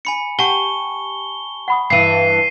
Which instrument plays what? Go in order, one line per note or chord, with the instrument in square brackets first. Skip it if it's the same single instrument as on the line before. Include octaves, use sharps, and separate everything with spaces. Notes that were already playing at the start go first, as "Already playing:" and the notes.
[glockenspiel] G#5 B5 C#7
[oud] G4 [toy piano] F#5 [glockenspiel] G#5 A5 C#6 [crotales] G7
[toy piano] F#5 B5 D#6
[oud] G2 E3 [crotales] C7 D#7